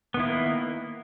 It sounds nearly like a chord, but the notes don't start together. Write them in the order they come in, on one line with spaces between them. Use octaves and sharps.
B3 D#3 E4 A#3